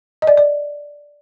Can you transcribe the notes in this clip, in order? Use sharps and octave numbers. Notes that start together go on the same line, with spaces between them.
D#5
D5
D5